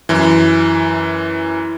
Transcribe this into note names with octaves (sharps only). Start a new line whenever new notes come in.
F#2 E3